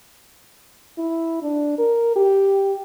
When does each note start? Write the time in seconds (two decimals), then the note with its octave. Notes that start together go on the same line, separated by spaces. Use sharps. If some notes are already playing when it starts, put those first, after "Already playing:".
0.98 E4
1.43 D4
1.78 A#4
2.16 G4